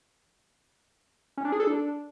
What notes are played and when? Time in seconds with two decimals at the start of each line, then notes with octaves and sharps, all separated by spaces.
1.37 C#4
1.45 D4
1.52 G#4
1.60 A4
1.67 D4